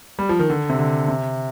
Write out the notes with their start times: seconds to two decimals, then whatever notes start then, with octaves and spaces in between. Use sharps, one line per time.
0.19 G3
0.29 F3
0.39 D#3
0.50 D3
0.69 C3
0.79 D3
1.08 C3